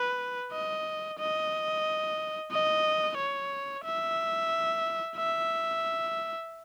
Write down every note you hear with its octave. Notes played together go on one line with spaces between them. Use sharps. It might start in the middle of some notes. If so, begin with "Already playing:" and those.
Already playing: B4
D#5
D#5
D#5
C#5
E5
E5